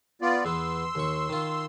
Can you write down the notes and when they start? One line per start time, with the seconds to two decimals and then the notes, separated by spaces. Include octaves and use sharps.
0.22 B3 F4 D5
0.45 E2 B3 C6 E6
0.95 D#2 C#6
1.29 D#3 F4